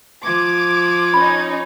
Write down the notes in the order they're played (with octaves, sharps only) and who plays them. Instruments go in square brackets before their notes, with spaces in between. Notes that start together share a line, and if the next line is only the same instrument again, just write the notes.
[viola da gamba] F3 [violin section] D6 [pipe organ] G#6
[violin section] C#4 D#4 [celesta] B5